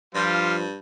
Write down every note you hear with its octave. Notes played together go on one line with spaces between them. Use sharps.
G2 F3 G3 F4 C5 C6 F6